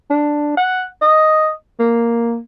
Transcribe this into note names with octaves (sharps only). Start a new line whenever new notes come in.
D4
F#5
D#5
A#3